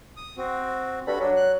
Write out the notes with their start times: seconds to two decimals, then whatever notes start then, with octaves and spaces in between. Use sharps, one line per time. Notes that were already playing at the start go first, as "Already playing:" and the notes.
0.17 D#6
0.37 C4 F#4
1.07 G2 F#4 A4 B5
1.20 F#3 D4
1.36 F#6